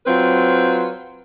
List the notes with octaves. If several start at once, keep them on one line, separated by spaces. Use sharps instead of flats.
F#3 C4 F4 B4